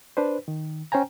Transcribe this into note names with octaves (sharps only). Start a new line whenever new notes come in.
D4 B4 C5
D#3
C#4 C5 G5 G#5 A#5